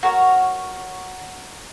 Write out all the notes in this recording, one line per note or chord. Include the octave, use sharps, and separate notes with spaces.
F#4 A#4 C#5